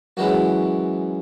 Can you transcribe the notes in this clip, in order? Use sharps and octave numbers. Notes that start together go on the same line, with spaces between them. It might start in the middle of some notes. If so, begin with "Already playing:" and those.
F#2 E3 G#3 C#4 E4 F#4